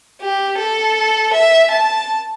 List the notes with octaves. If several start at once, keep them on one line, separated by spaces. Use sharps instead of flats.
G4
A4
E5
A5